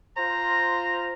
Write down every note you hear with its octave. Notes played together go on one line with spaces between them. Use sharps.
F4 C5 A#5